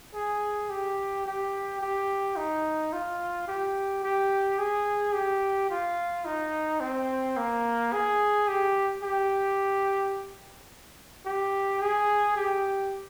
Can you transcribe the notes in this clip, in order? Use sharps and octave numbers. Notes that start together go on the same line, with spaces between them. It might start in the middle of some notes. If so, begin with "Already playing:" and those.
G#4
G4
G4
G4
D#4
F4
G4
G4
G#4
G4
F4
D#4
C4
A#3
G#4
G4
G4
G4
G#4
G4